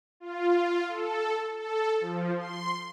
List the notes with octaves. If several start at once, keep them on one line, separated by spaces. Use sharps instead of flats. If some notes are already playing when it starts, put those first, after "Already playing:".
F4
A4
A4
F3
C6